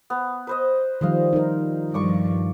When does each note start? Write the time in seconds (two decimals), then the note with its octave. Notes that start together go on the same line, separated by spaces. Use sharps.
0.10 B3
0.47 B4 C5 D#5
1.01 D#3 F3 G3 C5 D#5 F5
1.33 D#4 A#4
1.94 G2 F3 D5 C#6 D6